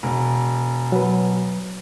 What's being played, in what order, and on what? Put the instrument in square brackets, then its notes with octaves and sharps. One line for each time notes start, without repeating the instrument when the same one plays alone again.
[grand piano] E1
[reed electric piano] F#3 B4